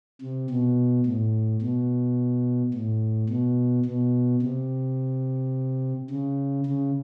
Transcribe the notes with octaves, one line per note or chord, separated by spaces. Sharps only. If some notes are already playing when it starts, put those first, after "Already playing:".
C3
B2
A2
B2
A2
B2
B2
C3
C#3
C#3